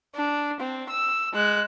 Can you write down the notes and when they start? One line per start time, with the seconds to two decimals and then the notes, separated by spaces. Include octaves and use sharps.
0.15 D4
0.60 C4
0.90 E6
1.33 G#3 F#6